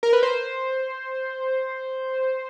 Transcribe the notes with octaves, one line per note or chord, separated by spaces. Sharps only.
A#4
B4
C5